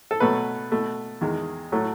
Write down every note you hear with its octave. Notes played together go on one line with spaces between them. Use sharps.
A4
B2 F#3 A3 B4
B2 A3
E2 D#3 G#3
A2 F#3 A3